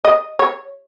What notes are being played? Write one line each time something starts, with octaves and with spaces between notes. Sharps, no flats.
D#5
C#5